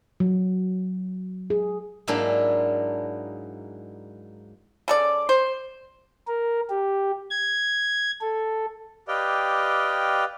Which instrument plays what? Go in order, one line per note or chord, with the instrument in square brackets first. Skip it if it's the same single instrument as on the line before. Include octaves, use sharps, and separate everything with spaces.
[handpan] F#3
G#4
[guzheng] G#2 F#3 G#3 A#3 D4 E4
[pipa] C#3 A4 D5
C5
[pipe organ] A#4
G4
G#6
A4
[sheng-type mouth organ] G4 B4 D5 D#5 F5 G5